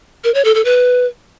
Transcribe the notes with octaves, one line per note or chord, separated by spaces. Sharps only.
A#4
C#5
A4
A4
B4